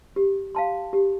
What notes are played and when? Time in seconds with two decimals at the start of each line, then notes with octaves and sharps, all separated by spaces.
0.16 G4
0.55 F5 A5 C6
0.93 G4